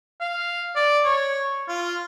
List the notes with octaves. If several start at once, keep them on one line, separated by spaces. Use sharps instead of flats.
F5
D5
C#5
F4